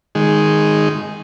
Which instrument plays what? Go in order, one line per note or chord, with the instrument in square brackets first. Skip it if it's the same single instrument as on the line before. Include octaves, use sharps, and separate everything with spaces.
[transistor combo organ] D#3 G#3